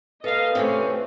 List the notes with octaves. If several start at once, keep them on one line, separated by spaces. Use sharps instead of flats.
A#3 A4 B4 D#5 F5
C3 E3 A3 C4 C#4